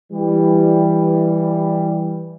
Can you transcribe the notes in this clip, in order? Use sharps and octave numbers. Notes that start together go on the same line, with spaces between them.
E3 G3